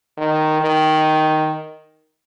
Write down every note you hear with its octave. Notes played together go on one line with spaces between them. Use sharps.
D#3
D#3